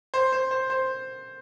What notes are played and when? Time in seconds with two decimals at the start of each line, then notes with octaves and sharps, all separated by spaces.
0.14 C5
0.32 C5
0.51 C5
0.70 C5